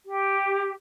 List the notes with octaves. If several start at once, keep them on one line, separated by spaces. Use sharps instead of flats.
G4